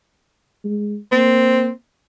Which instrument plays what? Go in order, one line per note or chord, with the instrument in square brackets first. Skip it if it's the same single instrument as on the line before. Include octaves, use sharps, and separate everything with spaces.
[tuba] G#3
[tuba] A#3 [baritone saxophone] C4